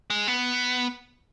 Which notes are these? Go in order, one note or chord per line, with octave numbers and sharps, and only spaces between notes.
G#3
B3